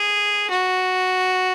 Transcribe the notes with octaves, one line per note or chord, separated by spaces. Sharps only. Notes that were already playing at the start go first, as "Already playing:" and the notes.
Already playing: G#4
F#4